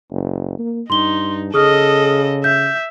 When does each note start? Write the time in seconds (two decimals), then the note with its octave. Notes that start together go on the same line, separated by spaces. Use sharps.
0.11 F#1
0.58 A#3
0.90 G2 D#4 C6 G7
1.54 C#3 G#4 A4 D#5 D#6 F6
2.44 E5 G6